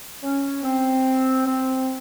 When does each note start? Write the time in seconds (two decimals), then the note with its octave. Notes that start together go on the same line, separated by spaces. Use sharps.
0.22 C#4
0.63 C4
1.46 C4